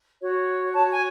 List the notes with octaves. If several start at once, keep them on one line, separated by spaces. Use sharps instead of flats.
F#4 C#5
F#4 C#5 A5
G#5